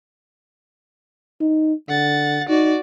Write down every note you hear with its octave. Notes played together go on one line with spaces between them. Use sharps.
D#4
D3 F#5 A6
D#4 F#4 D5